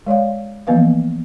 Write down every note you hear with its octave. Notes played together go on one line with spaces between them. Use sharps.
G#3 C#5 D5 F5
E3 F3 A#3 B3 B4 F5